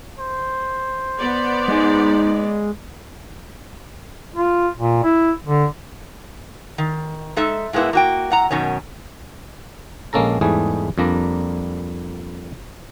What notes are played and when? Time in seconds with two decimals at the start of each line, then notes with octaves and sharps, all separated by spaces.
0.19 C5
1.19 B3 D5
1.68 G#3 D#4
4.36 F4
4.77 A#2
5.04 E4
5.46 D3
6.78 D#3
7.36 G#3 D#4 A4 E5
7.73 A2 G#3 A#3 B3 E4
7.93 A#3 F#4 G5
8.30 A2 F#5 A#5
8.50 F#2 B2 D#3 C#4
10.13 A#1 G#3 A#3 C#4 A4 A#5
10.41 E2 G#2 G3 A3 G#4
10.98 F2 G3 A#3 D4 A#5